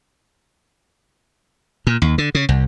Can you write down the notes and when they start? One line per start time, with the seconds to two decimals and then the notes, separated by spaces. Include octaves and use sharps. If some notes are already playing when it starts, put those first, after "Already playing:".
1.87 A#2
2.02 D#2
2.18 D3
2.35 C#3
2.49 C2